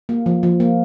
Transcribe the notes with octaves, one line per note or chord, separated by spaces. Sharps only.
A#3
F3
F3
A#3